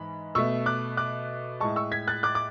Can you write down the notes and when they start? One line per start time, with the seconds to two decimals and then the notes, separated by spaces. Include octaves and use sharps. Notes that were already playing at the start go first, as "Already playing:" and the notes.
Already playing: G#2 E3 B5
0.35 B2 A3 C#6 E6
0.66 D6 F#6
0.97 D6 F#6
1.60 A2 G#3 A5 C#6
1.76 C#6 E6
1.92 G#6 B6
2.08 F#6 A6
2.23 D6 F#6
2.35 D6